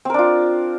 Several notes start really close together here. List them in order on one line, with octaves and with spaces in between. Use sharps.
C4 A#4 D4 F4